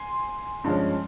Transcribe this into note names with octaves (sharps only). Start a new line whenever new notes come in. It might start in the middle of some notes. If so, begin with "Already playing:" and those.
Already playing: G#5 C6
G2 F3 G#3 C#4